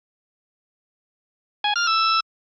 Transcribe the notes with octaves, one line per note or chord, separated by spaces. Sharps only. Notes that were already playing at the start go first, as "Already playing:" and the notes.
G#5
F6
E6